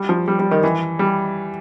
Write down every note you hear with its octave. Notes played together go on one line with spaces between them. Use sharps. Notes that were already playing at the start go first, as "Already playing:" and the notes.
Already playing: G3
F3
G3
G3
D#3
E3
G3